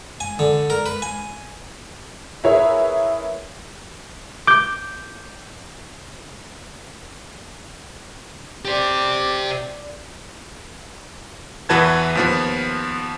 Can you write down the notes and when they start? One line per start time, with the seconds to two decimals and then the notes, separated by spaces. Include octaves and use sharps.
0.20 G#5
0.39 D3
0.70 A#4
0.86 B4
1.02 G#5
2.44 E4 G#4 A#4 B4 C#5 E5
4.47 D6 G6
8.65 G4 C5 D5
11.69 E2 E3 F#4 B4 A5 G#6
12.15 D#2 F3 B3